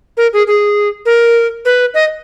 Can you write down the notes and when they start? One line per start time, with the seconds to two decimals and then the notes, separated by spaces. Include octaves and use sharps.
0.17 A#4
0.33 G#4
0.47 G#4
1.06 A#4
1.65 B4
1.94 D#5